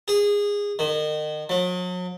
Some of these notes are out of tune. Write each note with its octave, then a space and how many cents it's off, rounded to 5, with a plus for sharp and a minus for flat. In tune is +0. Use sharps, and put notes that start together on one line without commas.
G#4 -20
D#3 -35
F#3 -40